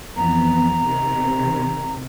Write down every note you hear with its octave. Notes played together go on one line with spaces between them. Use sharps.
F2 E3 B3 A#5
C3 D#3